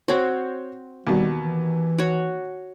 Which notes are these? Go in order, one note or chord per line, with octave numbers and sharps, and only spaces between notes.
C4 F#4 C5 C#5
D#2 B2 G3
E3
F#4 C#5